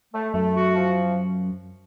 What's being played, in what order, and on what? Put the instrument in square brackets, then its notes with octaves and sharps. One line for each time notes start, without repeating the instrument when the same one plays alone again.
[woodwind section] A3
[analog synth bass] F#2 [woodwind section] A3
[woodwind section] F#4
F3